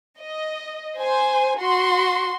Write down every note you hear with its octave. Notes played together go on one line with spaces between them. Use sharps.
D#5
C5 G#5
F#4 C6